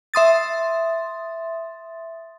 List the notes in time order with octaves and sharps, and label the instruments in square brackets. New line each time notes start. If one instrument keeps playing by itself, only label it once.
[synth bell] E5 C6 D#6 A6